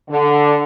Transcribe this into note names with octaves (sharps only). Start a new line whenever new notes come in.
D3